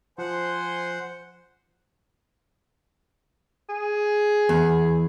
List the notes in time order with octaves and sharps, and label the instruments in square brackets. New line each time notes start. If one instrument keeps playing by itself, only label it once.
[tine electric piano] F3 F#6 [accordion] C5 F#5 [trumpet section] G#5 C6
[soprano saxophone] G#4
[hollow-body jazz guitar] E2